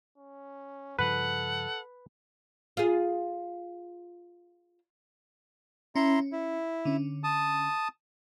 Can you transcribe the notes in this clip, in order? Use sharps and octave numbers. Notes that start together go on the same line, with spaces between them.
C#4
G2 C#3 F3 A4 B4 F#5
F4 G#4
C#4 E4 A#5 C6
E4
D3 C#4
A5 D#6